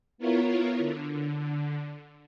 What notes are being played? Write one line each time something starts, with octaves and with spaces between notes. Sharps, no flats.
B3 E4 F4 A#4 C#5
D3